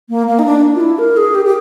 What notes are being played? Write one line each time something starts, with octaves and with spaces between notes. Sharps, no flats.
A#3
A#3
D#4
D4
F4
E4
A#4
G#4
G4
G4